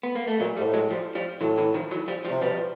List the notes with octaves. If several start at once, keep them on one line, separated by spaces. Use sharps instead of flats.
B3
A#3
A3
A#2 F#3 G#3
G3 A3
G#2
A2
F#3 G#3
F3 G3
F3 G3
A2 E3 F#3
D3 E3
D#3 F3
E3 F#3
F3 G3
F3 G3
C3
B2 F3 G3